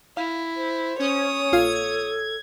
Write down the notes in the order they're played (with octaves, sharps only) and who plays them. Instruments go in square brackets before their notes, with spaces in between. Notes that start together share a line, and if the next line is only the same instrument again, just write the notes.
[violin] E4 [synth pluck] F5
[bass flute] C5
[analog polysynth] C#4 [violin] C#5 D#6
[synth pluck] A#1 F4 F5 [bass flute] A4 [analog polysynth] G#6